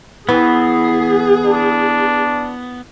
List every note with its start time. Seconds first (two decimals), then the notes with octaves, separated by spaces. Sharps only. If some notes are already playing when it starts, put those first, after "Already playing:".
0.29 E3 B3 G#4
1.45 D4